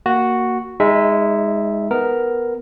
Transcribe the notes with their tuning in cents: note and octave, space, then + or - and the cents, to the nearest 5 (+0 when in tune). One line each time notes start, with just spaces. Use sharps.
A#3 +0 F#4 +0
G#3 -15 D#4 +20 E5 +0
B3 +0 A#4 +0